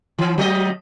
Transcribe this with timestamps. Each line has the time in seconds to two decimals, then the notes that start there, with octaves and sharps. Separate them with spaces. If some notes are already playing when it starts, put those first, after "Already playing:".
0.18 E3
0.38 F#3 A3 D#5